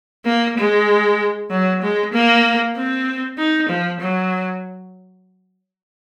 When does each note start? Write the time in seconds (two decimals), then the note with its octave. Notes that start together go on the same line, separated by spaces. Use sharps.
0.25 A#3
0.57 G#3
1.50 F#3
1.82 G#3
2.13 A#3
2.75 C4
3.38 D#4
3.69 F3
4.00 F#3